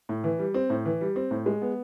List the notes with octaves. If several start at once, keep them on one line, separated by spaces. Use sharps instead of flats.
A2
E3
G3
C4
A2
E3
G3
C4
A2
G#3
B3